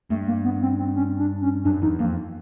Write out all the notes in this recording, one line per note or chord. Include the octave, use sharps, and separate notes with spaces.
G2 A3
A#3
B3
C4
C4
C#4
D4
C#4
F#2 D4
E2 D#4
F2 A#3